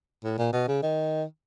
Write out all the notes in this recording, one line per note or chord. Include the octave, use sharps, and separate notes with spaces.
A2
A#2
B2
C#3
D#3